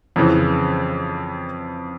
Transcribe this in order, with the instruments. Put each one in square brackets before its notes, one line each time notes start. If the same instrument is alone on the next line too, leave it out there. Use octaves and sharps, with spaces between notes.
[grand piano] F2 C#3 E3